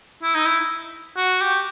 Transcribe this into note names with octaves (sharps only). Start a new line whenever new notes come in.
E4
D#4
E4
F#4
G4